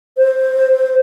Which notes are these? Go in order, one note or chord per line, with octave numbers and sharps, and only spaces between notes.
C5